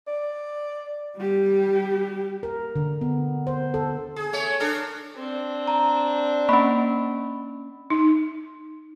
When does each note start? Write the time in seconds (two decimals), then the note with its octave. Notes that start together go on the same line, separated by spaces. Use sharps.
0.07 D5
1.17 G3 G4
2.43 A#4
2.76 D3
3.01 B3
3.47 C5
3.74 A4
4.16 G#4
4.33 A3 C#5
4.60 D4 A4 A#4
5.16 C4 D4
5.68 A#5
6.49 A#3 C#4 B5
7.90 D#4